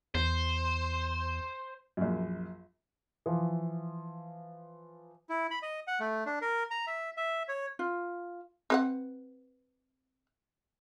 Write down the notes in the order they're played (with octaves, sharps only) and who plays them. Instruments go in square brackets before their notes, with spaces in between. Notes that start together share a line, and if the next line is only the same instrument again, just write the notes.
[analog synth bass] E2 [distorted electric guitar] C5
[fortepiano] A#1 F#2
[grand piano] E3 F3
[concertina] E4
B5
D#5
F#5
A3
D4
A#4
A#5
E5
E5
C#5
[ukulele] F4
[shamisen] C4 B4 F#5